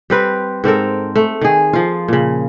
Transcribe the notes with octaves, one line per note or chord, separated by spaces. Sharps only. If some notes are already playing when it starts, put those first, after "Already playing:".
G3 C4 B4
G#2 C4 A4 A#4
A3
D#3 G#4
F3 F4
A#2 C#3